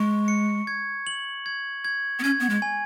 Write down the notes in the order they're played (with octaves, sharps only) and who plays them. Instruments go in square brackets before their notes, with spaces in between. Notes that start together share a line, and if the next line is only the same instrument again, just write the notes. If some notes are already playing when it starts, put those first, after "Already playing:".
Already playing: [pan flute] G#3 [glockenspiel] C#6
[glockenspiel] C#7
G#6
F#7
G#6
G#6
[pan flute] B3
[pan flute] C#4 [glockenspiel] G#6
[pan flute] B3
G#3
[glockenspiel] G#5